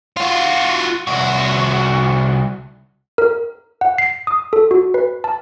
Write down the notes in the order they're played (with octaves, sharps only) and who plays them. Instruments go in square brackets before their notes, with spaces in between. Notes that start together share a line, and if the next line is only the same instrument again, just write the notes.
[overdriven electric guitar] F4 F#4
C2 F#4
[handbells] A#4
F#5
C7
D#6
A4
F#4
B4
A5